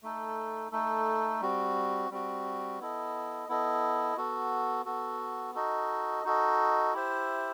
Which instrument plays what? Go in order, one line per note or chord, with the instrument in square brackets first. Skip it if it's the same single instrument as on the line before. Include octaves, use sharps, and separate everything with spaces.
[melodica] A3 D#4 A4
A3 D#4 A4
G3 C4 F#4
G3 C4 F#4
B3 E4 A4 D#5
B3 E4 A4 D#5
B3 F#4 A4
B3 F#4 A4
D#4 F#4 A4 D#5
D#4 F#4 A4 D#5
E4 G4 C5 E5